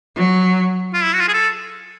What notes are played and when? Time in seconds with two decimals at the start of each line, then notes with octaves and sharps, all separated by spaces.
0.16 F#3
0.94 F4
1.04 E4
1.13 F#4
1.20 F4
1.28 G#4
1.33 A4